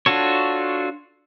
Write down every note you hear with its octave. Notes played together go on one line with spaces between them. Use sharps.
D4 F4 F#4 A4 C#5